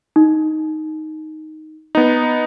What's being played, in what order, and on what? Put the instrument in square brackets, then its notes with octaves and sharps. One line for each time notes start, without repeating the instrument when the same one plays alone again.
[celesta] D#4
[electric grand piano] B3 D#4